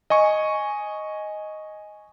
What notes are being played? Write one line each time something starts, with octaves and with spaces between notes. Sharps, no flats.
D#5 G#5 C#6